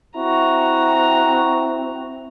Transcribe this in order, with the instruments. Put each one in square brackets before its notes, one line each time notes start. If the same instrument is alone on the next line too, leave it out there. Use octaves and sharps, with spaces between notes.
[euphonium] C4 [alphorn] E4 [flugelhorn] F#4 [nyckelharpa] A#5